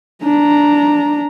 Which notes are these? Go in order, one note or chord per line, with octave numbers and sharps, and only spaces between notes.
D4 A#5